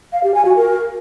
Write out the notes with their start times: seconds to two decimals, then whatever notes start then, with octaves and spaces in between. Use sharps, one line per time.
0.13 F5
0.24 G4
0.34 G#5
0.45 F#4
0.56 A#4